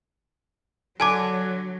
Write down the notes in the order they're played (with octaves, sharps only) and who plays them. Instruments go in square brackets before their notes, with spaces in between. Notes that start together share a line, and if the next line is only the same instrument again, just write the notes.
[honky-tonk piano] D3 G#6 [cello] F#3 [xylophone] G#5 A5 D6